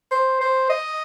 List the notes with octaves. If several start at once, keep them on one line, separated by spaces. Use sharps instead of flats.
C5
C5
D#5